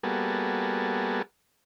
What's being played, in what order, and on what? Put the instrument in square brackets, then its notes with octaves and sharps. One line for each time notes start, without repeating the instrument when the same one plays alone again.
[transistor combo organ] G3 A#3 B3 F#4 G#4 A4